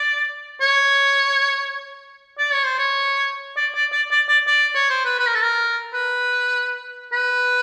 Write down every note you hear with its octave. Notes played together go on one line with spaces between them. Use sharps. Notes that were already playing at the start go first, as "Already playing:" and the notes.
Already playing: D5
C#5
D5
C#5
C5
C#5
D5
D5
D5
D5
D5
D5
C#5
C5
B4
B4
A#4
A4
A#4
B4
B4